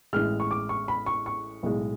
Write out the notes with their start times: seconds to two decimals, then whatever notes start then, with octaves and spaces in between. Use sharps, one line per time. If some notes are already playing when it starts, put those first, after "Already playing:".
0.13 A1 A2 G#3 F6
0.40 C#6
0.51 D6
0.69 C#6
0.88 B5
1.06 C#6
1.26 C#6
1.63 B1 A2 G#3